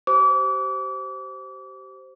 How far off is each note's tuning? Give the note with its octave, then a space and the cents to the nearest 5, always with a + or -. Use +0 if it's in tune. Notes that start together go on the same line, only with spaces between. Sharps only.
G4 -30 C5 +0 D6 -35